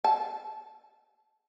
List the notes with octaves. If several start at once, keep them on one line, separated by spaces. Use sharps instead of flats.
A5